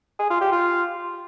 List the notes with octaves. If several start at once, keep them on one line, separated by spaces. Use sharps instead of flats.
G#4
F4
G4
F4